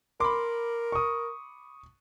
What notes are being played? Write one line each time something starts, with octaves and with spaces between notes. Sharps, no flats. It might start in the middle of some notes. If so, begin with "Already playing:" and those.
A#4 B5 C6 D6
C#6 D#6